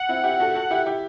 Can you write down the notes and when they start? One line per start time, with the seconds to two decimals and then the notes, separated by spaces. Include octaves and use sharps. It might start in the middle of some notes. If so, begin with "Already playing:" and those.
Already playing: F#5
0.09 C4 E4
0.24 E4 G4
0.40 F#4 A4
0.55 F#4 A4
0.70 E4 G4
0.86 E4 G4